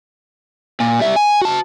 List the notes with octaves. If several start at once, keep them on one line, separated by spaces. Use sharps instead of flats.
A#2
G3 E5
G#5
F#4 A5